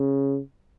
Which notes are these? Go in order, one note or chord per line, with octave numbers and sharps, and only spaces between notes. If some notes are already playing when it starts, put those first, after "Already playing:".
Already playing: C#3